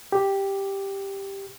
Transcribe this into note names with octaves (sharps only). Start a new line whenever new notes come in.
G4